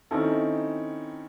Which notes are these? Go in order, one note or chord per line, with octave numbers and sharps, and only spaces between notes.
D#3 C4 C#4 D#4 E4 A4